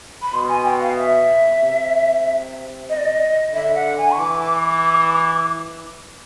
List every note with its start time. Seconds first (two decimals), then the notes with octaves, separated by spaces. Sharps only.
0.22 B5
0.33 B2 C6
0.49 G#5
0.65 G5
0.81 F5
0.98 E5
1.61 C3
2.89 D#5
2.97 D5
3.05 D#5
3.54 D3 E5
3.75 F#5
3.97 G#5
4.11 C#6
4.18 E3 D6